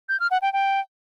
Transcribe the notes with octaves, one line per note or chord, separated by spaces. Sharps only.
G6
F6
F#5
G5
G5